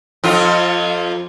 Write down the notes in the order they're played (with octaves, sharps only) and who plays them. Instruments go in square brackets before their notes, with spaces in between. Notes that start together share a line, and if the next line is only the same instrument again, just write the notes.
[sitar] F2 F4